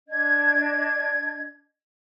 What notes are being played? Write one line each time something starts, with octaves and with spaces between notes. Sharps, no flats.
D4 D#5 G#6